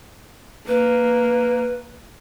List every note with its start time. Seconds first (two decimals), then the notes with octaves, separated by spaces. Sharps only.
0.67 A#3 B4